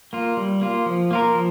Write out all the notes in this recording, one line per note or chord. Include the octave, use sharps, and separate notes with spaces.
A#3 F4
G3
A#3 F4
F3
A#3 F4 A#4
F3